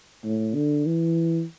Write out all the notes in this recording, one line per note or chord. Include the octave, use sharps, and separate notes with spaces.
A2
D3
E3